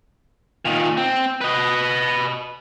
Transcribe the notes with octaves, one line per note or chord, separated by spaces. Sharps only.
A#2 D#3
C4
B4 D#5